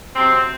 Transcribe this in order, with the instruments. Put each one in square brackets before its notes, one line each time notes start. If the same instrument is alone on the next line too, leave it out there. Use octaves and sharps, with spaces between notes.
[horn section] C3 F#3 C4